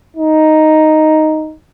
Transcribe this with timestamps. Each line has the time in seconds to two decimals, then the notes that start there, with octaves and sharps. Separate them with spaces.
0.17 D#4